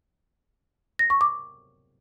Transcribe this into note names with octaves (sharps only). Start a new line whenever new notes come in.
A#6
C#6
D6